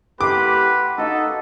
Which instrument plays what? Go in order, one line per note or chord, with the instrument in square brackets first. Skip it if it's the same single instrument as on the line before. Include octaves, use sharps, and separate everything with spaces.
[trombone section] A3 E4 G4 [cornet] B4 [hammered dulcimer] F#5 C6 [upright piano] D6
[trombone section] D#4 [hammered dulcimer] F#4 D#5 F5 [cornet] A4